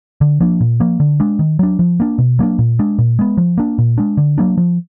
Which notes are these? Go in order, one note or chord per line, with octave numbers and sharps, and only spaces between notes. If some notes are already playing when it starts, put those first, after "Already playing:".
D3
F3 A#3 D4
A#2
F3 A#3
D3
G#3 D4
D#3
F#3 D4
F3
A#3 D4
B2
F#3 A#3 D4
A#2
G#3 D4
A#2
G#3 B3
F3
A#3 D4
A#2
G#3 D4
D3
F#3 A#3 D4
F3